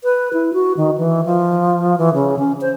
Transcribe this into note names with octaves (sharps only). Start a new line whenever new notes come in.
B4
E4
F#4
D#3
E3
F3
E3
C#3
C#4
C5